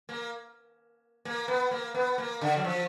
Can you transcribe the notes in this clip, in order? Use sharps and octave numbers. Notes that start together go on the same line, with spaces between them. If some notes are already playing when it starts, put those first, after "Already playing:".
A#3
A#3
B3
A#3
B3
A#3
D3
F#3
F3